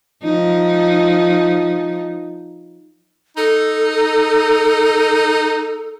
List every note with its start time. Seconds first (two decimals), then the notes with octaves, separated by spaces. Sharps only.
0.24 F3 D#4
3.37 D#4 A4